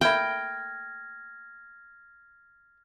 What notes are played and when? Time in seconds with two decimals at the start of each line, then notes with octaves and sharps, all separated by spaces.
0.01 A3 A#3 E4 G5 F6 G#6 A#6